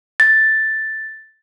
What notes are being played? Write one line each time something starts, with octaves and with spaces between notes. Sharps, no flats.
A6